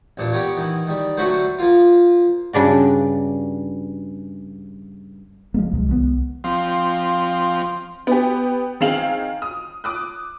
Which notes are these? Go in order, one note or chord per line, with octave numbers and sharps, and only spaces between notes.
A1 A#2 D4
B3 G4 A#4 C#5
D#3 E3
D#3 G3
D3 F#3 A3 F#4 B4 C5
F3 A#3 F4
G2 C#3 D4 F#4
F3 G#3 A#3
C#2 C3 F#3 G#3
C2 D#3 G#3 B3
F3 C4
B3 G4
D#3 C4 G#4 F5 F7 F#7
D#6
D6 D#6 F#6